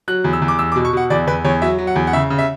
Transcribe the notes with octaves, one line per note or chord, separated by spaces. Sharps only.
F#3 F#6
E2
E6
E2
D6
E2 E6
D6
B2
C#6
B2 F#5
E2 D5
E2 B4
E2 C#5
F#3 E5
F#3
F#5
E2
F#5
C#3 E5
C#3
E5